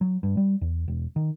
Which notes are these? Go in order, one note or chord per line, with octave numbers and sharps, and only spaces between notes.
F#3
G2
G3
E2
E1
D#3